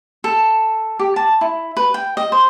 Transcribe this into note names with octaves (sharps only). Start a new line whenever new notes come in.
A4
G4
A5
E4
B4
G5
D#5
C5